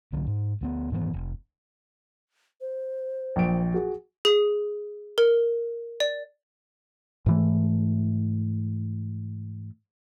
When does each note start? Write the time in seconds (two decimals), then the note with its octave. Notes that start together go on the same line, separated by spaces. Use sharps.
0.13 C2 D3 F#3
0.27 G#2
0.61 D2 A#3 B3
0.92 G#2 D#3 E3 B3
1.13 F1
2.61 C5
3.36 A#1 G5 D7
3.74 F#4 G#4
4.25 G#4
5.18 A#4
6.00 D5
7.26 G#2 E3 A3